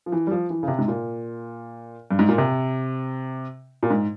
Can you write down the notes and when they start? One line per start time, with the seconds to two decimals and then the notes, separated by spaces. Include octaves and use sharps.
0.06 F3
0.12 E3
0.27 G3
0.31 F3
0.50 E3
0.63 C#3
0.68 C3
0.78 G#2
0.88 A#2
2.11 G2
2.19 G#2
2.28 A#2
2.38 C3
3.83 A#2
3.90 G#2